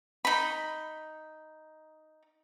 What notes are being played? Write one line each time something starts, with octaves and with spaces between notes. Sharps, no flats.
D#4 B5